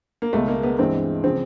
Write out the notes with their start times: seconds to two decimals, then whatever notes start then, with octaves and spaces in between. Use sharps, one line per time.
0.22 A#3
0.33 C#2 B2 G#3 A3
0.48 A#3
0.63 B3
0.79 G2 E3 G#3 C4
1.24 C#3 F3 C4